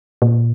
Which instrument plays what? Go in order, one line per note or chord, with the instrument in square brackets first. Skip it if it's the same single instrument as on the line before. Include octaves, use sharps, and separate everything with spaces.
[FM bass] A#2